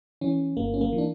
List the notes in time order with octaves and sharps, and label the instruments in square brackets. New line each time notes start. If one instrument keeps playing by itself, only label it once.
[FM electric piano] E3 C#4
G1 A#3
C#4
A#3
E3
D4